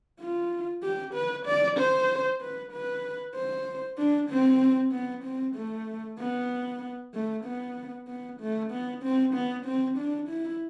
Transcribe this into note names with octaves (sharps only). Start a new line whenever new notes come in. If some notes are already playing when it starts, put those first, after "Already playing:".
F4
G4
B4
D5
C5
B4
B4
C5
D4
C4
B3
C4
A3
B3
A3
B3
B3
A3
B3
C4
B3
C4
D4
E4